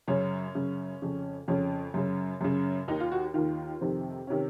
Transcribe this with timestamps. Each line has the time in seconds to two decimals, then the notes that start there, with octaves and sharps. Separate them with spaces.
0.08 F#2 C#3 C#4
0.55 F#2 C#3
1.02 F2 C#3
1.48 F2 C#3 C#4
1.94 F#2 C#3
2.41 F#2 C#3
2.88 D#2 D#3 D#4
3.00 F4
3.12 F#4
3.34 D#2 D#3 F4
3.81 F2 C3 D#3 C4
4.27 C3 D#3 C#4